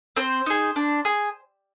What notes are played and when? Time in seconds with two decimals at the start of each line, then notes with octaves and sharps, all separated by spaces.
0.16 C4 C5
0.46 D#4 G#4
0.76 D4
1.05 G#4